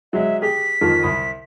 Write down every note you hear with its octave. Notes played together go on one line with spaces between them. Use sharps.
F#3 G#3 E5
G4 G#4 B6
F2 D#3 F3
C2 B5 D#6